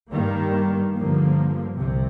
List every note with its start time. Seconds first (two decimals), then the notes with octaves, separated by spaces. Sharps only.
0.12 G2 D#3 G3 A#3
0.95 G2 D3 F3 A#3
1.79 C2 C3